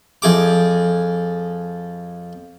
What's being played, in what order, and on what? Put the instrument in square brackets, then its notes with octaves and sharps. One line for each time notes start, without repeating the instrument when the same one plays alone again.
[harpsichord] F2 G#4 D6